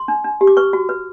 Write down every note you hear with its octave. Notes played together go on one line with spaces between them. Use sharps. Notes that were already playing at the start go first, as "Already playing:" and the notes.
Already playing: C6
D4
D4
G4
D6
B4 C#6
F#4
B4